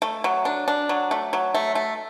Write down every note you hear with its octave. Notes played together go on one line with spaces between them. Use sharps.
A3
F#3
D4
D4
F#3
A3
F#3
A3
A3